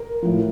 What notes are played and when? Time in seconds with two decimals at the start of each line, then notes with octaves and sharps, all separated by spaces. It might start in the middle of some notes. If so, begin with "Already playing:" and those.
Already playing: A#4
0.22 A2 F3